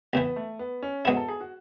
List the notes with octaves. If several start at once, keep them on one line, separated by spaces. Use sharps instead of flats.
B1 A2 E3 B3
A3
B3
C#4
G#2 F#3 B3 E4 G#4
A4
G#4
F#4